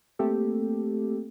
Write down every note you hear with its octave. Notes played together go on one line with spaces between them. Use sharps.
A3 A#3 C4 G4 A4